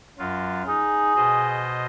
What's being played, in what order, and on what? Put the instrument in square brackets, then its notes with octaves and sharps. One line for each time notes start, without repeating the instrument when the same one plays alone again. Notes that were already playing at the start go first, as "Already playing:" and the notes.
[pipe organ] F#2 F#3 F4
[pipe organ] D#4 [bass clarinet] G#4
[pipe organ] B2 C5 D#5